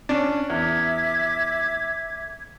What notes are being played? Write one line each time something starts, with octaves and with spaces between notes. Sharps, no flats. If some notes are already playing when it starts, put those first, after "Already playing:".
C#4 D4
E2 E5 D6 G#6